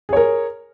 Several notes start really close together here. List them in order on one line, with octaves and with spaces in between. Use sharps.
G#4 C#5 A#4